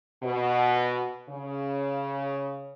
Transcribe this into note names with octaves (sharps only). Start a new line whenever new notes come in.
B2
C#3